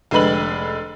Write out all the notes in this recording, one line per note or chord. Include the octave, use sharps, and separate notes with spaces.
F1 D3 G#3 B4 B5 F#7